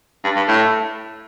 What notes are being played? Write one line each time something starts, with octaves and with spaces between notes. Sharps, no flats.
G2
G2
A2